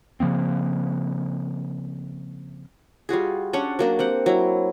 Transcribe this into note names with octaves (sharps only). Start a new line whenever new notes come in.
C#3 F3 A#3 C4
G3 F4 F#4 G#4
C#4 D4 F#5
F#3 A#3 D4
C4 G4 F#5
F#3 E4